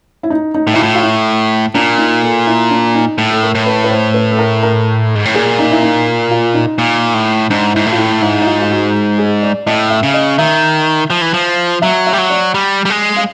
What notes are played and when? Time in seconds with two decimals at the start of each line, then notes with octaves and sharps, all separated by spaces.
0.23 E4
0.30 D#4
0.55 D#4
0.67 A2
0.73 A#2 E4
0.78 A2 F4
0.95 F4
1.03 E4
1.75 A#2 D4
1.98 D#4
2.23 A4
2.47 E4
2.71 D4
2.95 D#4
3.18 A2
3.31 A4
3.43 A#4
3.55 A2
3.66 B4
3.84 B4
3.91 C5
4.14 B4
4.32 A4
4.39 A#4
4.63 A#4
5.15 G#2
5.25 A2
5.35 A#2 G#4
5.59 D#4
5.71 E4
5.82 D#4
6.31 F4
6.54 D#4
6.78 A#2
7.14 A2
7.50 G#2 D4
7.74 G#2 E4
7.86 A2
7.92 F4
7.98 E4
8.22 G#2 E4
8.41 E4
8.47 F4
8.61 F4
8.70 F#4
9.18 G#4
9.43 D5
9.67 A2 D#5
9.90 E5
10.03 C#3
10.14 D#5
10.38 D#3 E5
11.10 F3
11.21 E3
11.34 F3
11.82 F#3 E5
12.07 E5
12.13 G3
12.18 F#3
12.30 D5
12.54 G3
12.85 G3
12.90 G#3
13.16 F5